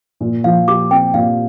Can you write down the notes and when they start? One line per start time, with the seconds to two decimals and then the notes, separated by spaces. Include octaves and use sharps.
0.20 A#2
0.44 F3 F5
0.68 G4 D6
0.91 C4 G5
1.14 A#2 F5